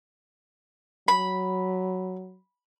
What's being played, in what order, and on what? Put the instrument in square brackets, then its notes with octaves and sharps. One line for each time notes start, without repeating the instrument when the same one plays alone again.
[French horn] F#3 [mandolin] B5